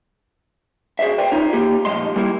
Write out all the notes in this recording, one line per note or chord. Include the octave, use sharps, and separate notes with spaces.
F#4 G#4 C5 D5 E5
B4 C5 D5 G5
D#4 F4 C#5
A#3 G4
F2 A#2 F#3 G#3 D#5 C6
G3 A#3 E4